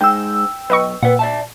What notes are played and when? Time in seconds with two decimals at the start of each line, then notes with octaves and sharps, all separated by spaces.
0.01 G#2 G#3 D#4 G5 E6
0.70 B1 B4 D#5 C#6
1.03 A#2 B4 F#5
1.19 D5 E5 A5